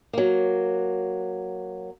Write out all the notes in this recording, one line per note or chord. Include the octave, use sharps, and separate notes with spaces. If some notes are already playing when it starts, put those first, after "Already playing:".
F#3 A#3